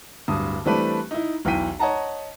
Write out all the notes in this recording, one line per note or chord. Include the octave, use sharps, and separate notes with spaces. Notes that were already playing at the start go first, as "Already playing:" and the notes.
D1 G2 D#6
E3 G3 A3 C4 D4 B4
D#4 E4
B1 E2 E3 G5 B6 D#7
C#5 D#5 F#5 A5 A#5